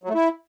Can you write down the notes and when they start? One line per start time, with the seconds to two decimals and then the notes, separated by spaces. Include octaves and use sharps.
0.04 F#3
0.09 A3
0.14 E4